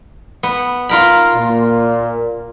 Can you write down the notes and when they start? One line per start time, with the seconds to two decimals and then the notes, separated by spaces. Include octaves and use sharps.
0.43 B3
0.89 F4 A#4 B5
1.36 A#2